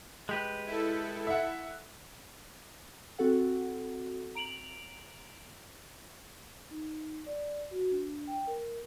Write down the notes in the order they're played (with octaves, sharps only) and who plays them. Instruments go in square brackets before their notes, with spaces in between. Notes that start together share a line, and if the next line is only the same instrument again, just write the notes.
[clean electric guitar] G#3 G4 B4
[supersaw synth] E4 A4
[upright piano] E5 F#5
[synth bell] C4 F#4 A4 F#5
A#5 D7 F7 F#7
[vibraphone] D#4
D5
F#4
D4
G5
A#4